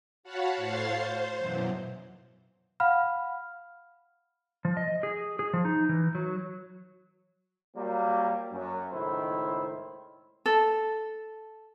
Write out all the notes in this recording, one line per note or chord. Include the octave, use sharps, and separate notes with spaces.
F#4 C#5 F5 F#5 A5 B5
A2 C5 C#5 F5 A6 C7
C5
F#2 B2 E3 F#3
F5 F#5 B5 F6
F3
D#5
G#4
G#4
F3
D#4
E3
F#3
F#3 G3 A#3
F#2
C#2 A2 D#3 E4 C5
A4